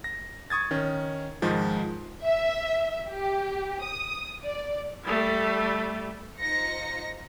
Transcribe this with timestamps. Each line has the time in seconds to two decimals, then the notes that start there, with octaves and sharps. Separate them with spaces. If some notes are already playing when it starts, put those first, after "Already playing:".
0.04 A#6
0.50 C#6 D#6 G#6 A6
0.71 D#3 C#4
1.42 G#2 D#3 F3 G#3
2.21 E5
3.08 G4
3.82 D#6
4.42 D5
5.04 G3 A3
6.39 D#4 F4 C5 A#6 C#7